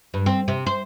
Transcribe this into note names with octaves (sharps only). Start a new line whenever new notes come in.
G2
C4
C3
C5